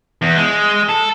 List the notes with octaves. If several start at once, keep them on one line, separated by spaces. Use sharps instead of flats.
E2
G#3
A4